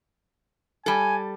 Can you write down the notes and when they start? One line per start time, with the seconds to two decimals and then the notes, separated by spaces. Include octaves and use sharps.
0.86 G3 A4 G#5